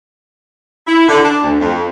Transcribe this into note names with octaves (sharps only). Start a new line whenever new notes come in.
E4
D3
D4
D2
F2